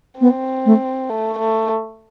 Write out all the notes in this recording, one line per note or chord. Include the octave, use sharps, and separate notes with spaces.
B3 C4
A3
A3
A3